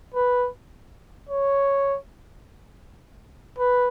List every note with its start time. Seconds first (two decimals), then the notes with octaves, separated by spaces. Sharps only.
0.14 B4
1.29 C#5
3.59 B4